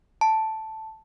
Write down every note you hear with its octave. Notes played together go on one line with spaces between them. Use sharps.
A5